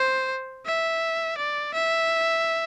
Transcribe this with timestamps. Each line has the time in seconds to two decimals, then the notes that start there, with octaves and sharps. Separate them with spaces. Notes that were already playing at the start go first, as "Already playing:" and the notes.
Already playing: C5
0.66 E5
1.37 D5
1.74 E5